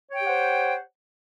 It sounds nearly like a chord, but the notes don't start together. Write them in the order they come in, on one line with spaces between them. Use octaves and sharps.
C#5 G5 G4 F#5 C5